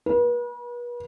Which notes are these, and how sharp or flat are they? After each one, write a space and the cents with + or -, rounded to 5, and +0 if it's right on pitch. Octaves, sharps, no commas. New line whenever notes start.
B4 -40